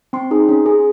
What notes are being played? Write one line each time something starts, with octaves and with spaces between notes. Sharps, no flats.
C4 C6
D#4 G#4
C#4
G#4